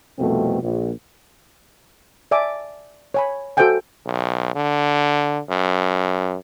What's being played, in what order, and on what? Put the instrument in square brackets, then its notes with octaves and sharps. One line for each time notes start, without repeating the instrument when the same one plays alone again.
[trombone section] C2 F2 B2 A3 C4
A#1
[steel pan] D5 E5 G#5 A5 D6
C#5 G#5 B5
F#4 A4 C5 E5 G5 G#5
[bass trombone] B1
D3
F#2